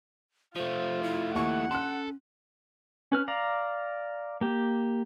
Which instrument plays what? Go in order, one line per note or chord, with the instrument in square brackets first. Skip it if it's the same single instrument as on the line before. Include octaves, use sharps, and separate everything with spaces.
[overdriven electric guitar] F3 A3 [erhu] F4 [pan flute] C5
[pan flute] E4
[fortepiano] D#2 C#6 [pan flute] E4 [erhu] F#5
[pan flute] C#4 [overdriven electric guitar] A4 [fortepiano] C6 F#6
[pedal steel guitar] C#4 B4 F6
D5 F5 A#5
A#3 G4